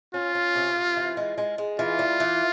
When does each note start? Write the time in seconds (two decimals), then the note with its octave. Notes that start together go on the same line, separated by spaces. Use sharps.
0.14 C#4 F4
0.35 C#4
0.55 C3
0.76 C3
0.97 E3
1.17 G#3
1.38 G#3
1.58 G#3
1.79 E3 F4
1.99 G3
2.20 E3